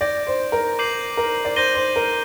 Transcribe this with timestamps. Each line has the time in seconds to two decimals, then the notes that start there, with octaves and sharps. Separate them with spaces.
0.01 D5 G6 A#6 D7
0.27 C5
0.52 A#4
0.79 D6 G6 C7 D#7 F#7
1.17 A#4
1.45 D5
1.56 C5 G6 A#6 D#7 G7
1.75 C5
1.96 A#4